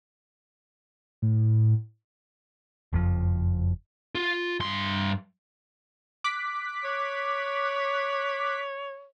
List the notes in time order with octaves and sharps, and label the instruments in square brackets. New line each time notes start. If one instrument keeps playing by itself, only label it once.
[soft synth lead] A2
[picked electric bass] F#1 F2 F3
[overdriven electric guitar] F4
G2 C6
[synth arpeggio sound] D6 F#6 B6
[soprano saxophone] C#5